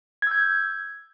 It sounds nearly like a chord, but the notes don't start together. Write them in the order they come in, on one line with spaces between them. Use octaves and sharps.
G#6 E6 G6